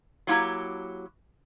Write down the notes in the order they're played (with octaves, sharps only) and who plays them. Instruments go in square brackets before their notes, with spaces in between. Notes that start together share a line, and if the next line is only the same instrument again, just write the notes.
[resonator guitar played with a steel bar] F#3 A#3 E4 G4 A#5